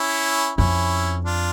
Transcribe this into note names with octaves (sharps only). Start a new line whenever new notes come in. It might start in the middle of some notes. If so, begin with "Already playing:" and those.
Already playing: C#4 E4
F2 C#4 E4
D4 F4